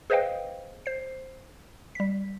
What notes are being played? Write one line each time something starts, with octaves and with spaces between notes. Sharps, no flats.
G#4 B4 C5 D#5 F5 G5
C5 C7
G3 B6